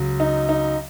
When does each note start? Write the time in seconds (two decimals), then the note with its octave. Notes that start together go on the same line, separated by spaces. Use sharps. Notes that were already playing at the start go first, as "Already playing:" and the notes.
Already playing: C#2 C#3 F#3
0.20 D#4
0.49 D#4